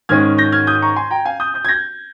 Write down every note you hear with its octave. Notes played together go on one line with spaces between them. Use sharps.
G#2 D#3 G#3 C#4 F6 G#6
G6 A#6
F6 G#6
D#6 G6
A#5 C#6
G#5 C6
G5 A#5
F5 G#5
D#6 G6
D#6 G6
G#6
G6 A#6